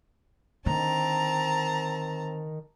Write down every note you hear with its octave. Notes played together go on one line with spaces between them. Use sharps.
D3 D#3 C4 A5 A#5